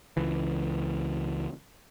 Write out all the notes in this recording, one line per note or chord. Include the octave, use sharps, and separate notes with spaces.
C#2 E3